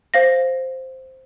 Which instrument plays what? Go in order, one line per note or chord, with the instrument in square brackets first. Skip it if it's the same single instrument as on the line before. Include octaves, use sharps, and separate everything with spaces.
[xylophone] C5 F5 A#6